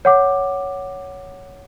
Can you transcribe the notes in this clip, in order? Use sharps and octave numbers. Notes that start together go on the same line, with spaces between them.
C#5 F#5 D6